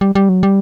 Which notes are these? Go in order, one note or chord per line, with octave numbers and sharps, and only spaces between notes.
G3
G3
F#3
G3